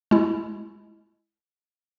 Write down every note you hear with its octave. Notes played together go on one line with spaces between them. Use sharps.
G#3 E4